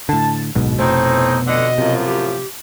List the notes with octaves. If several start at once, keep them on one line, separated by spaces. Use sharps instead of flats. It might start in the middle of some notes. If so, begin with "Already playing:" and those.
A2 D3 A5
D1 B1 G#2 B2
F1 A2 A3 C4 D#4
F2 D3 D#5 F#5
F#2 A2 C3 F3
G4